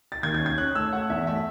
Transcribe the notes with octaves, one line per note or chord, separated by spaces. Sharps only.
A6
D#2 G#6
G#6
C#4
G#6
C#4 F#6
A3 E6
A3 F#5
E2 E5
A3 E5